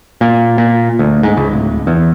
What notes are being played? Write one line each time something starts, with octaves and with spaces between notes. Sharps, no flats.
A#2
A#2
D2
G#2
C#2
D1
E2